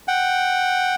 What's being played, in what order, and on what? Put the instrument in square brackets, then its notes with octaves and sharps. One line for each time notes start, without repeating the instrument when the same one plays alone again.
[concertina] F#5 G5